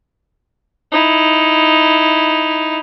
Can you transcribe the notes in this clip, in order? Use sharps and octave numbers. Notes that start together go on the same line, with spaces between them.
D#4 E4